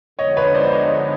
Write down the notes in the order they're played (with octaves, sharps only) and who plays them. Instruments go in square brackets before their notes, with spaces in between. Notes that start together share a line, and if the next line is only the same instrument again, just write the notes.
[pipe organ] D3 F3 G#3 B3 D#4 [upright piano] C#5 D#5
[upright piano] B4 C#5
C5 D5
C#5 D#5